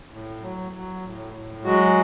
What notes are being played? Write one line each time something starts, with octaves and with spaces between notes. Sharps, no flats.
A2
F#3
F#3
A2
A2
F#3 G#3 F#4